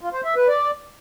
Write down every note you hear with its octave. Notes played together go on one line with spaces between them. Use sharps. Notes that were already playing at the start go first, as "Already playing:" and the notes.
F4
C5
E5
B4
D5